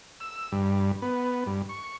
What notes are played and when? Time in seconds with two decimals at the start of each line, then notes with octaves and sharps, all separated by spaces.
0.20 E6
0.52 G2
1.02 B3
1.46 G2
1.69 C#6